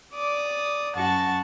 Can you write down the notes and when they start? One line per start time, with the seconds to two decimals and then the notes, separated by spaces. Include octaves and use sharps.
0.14 D5 D6 D#6
0.95 F#2 F#4 A5 C#6 A6